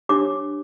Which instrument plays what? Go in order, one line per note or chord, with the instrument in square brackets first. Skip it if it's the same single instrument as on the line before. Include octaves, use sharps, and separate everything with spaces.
[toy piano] D4 G4 C#5 D6